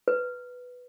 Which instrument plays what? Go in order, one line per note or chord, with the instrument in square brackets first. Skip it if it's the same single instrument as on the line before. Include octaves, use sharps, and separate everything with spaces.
[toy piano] B4